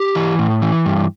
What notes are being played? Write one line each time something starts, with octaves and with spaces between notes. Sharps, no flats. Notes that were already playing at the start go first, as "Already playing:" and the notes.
Already playing: G4
E3
A2
E3
G2